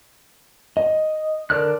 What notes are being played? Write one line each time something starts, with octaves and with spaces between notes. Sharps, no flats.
D#5
D3 A#4 D5 F6 F#6